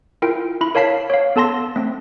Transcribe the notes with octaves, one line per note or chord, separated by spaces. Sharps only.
E4 F4 A#4 G5
E4 B5
A#4 C#5 F5 A5 B6 C7
C#5 F5
B3 A4 A5 C6 A#6
A3 C4